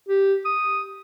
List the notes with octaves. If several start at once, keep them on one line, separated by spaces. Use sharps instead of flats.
G4
D#6